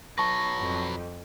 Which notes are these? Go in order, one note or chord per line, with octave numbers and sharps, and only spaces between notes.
F#3 B4 A5 C#6 A#6
F2